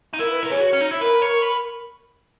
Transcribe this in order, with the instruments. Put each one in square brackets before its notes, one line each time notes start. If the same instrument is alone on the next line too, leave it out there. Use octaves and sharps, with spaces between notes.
[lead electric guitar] D#4
[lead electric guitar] E4 [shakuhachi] A#4
[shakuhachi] B4
[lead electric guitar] A#4
[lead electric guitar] G#4 [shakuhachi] C#5
[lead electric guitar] F#4
C#4
D#4
E4
[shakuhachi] A#4 [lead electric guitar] B4
[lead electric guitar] C#5
B4